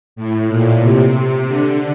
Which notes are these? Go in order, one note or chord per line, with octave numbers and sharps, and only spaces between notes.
A2
A#2
C3
D3